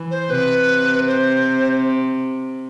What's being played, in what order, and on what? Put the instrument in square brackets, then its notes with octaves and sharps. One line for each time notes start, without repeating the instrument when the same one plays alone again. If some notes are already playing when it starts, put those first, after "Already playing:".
Already playing: [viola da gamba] E3
[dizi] C5
[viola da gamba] C3 [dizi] B4
[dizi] C5